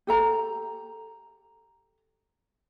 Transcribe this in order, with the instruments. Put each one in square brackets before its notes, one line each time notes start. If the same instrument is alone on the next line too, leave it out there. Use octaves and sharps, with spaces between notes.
[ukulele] G4 A4 A#5